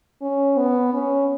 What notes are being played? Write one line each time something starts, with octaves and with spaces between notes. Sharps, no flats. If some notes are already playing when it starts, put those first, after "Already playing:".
C#4
B3
C#4